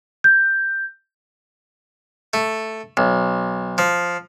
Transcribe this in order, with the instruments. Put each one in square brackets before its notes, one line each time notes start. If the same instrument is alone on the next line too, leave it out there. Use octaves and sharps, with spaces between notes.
[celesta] G6
[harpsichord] A3
B1
F3